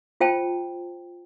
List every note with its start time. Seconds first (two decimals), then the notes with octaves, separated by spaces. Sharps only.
0.20 F4 C5 G5 A5